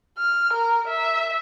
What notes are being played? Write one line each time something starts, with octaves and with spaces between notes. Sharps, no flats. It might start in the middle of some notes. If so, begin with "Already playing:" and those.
F6
A#4
E5